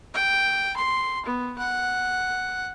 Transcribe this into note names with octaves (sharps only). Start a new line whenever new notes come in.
G5
C6
B3
F#5